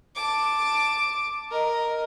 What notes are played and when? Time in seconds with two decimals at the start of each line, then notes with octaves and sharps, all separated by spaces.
0.15 A5 D6
1.51 A#4 D#5